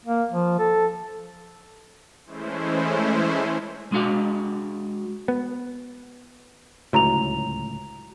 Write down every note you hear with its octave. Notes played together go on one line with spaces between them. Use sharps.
A#3
F3
A4
E3 G#3 A3 C#4 E4 C5
G#3 D4 F#4 F5
B3
D1 C#2 A2 F#4 A#5 F7